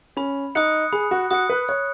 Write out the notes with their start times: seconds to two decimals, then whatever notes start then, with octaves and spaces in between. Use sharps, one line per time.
0.17 C#4 B5
0.55 D#4 D#6 F#6 C#7
0.93 G#4 B5
1.11 F#4
1.31 F#4 D#6 F#6 C#7
1.50 B4
1.69 C#5 F#6